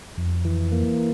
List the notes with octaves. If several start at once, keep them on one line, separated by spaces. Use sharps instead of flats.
F2
E3
A#3